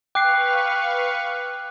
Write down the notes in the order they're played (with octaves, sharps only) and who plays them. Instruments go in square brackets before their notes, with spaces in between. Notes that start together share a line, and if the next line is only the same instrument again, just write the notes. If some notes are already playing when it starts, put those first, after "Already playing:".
[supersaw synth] B4 F5 C#6 [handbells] G5 C7 [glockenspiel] D6 F#6